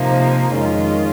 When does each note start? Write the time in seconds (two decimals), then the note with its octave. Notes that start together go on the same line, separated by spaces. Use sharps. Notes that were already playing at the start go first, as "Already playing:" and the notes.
Already playing: C3 F3 A#3 D#4
0.51 F2 D#3 G#3 C#4 F4